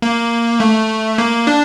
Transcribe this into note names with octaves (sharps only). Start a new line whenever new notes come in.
A#3
A3
A#3
D4